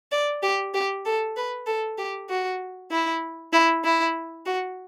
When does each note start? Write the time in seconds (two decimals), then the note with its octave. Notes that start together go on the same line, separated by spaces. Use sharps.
0.12 D5
0.43 G4
0.74 G4
1.05 A4
1.36 B4
1.67 A4
1.98 G4
2.29 F#4
2.91 E4
3.53 E4
3.84 E4
4.46 F#4